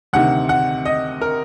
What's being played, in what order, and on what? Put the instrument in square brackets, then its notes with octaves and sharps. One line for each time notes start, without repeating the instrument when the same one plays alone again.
[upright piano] D2 C3 D#3 F#5
F#5
D#5
A#4